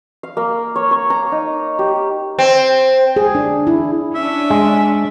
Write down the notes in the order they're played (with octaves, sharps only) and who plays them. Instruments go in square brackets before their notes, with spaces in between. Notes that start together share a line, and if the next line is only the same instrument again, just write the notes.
[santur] F5
A#3
C#5
C#6
A#5
D#4
G4
[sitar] C4
[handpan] G#4
D4
E4
[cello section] C#4 D4 [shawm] E5
[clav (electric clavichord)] G#3